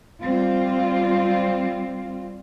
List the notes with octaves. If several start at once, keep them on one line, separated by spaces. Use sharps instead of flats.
G3 C4 F4